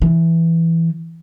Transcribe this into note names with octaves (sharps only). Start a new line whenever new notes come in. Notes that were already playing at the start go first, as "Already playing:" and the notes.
E3